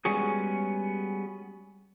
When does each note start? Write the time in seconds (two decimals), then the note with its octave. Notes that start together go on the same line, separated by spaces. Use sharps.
0.05 G3 G#3 B3 C#4 F#4 G#4